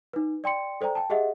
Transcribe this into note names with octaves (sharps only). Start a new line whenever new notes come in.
D#4 B4
D5 G5 C6 C#7
A4 C5 D5 G5 A#5
G5 A5
G4 G#4 D#5 E5 F#5